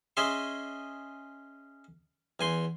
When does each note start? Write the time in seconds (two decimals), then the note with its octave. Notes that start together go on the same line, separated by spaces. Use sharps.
0.17 C#4 G#4 D#5 E5 C6
2.40 E2 G#5 C6